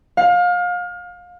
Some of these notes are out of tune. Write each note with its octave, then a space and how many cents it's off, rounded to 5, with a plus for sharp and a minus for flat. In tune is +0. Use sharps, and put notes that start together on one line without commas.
F5 +30